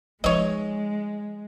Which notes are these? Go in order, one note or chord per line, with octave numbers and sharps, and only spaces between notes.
F3 G#3 D#4 C#5 D#5